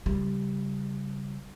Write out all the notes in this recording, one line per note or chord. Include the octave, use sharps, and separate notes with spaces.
C#3 G3